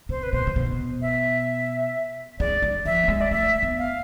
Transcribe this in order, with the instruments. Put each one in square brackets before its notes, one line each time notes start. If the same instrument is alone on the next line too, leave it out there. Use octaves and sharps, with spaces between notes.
[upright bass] C3 [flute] C5
[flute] B4
[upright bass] B2 [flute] C5
[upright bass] C3
B2
[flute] E5
[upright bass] G#3 [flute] D5
[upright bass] G#3
[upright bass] F3 [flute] E5
[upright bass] A3
G#3
[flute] D5
[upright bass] A3 [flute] E5
[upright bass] B3
[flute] F5